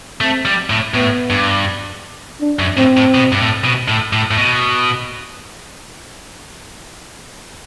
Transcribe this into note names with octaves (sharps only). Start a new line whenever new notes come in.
A3 C4
G3
A2
A2 B3
G2
D4
F#2
A2 C4
A2
B2
G2
A2
B2
A2
A2
A2
B2